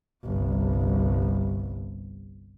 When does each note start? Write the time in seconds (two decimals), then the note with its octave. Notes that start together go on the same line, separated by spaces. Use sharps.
0.25 G1 C2